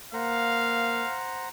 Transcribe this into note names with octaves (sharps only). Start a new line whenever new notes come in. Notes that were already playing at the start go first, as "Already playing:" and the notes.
A#3 C5 F5 F#5 A#5